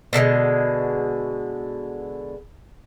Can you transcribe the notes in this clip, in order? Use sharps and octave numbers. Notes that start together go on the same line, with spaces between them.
B2 D3 D#3 G#3